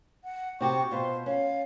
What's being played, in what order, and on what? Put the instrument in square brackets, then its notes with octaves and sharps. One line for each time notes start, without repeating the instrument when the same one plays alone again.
[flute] F#5
[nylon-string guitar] C3 F#4 G4 [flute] C#6
[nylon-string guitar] B2 F4 [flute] C5
[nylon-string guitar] C#4 [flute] F5